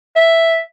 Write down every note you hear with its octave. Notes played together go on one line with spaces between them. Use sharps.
E5